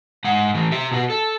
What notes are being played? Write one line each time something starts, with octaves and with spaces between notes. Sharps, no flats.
G#2 F#5
E3 A3
G4 E5
B2 F#4
A4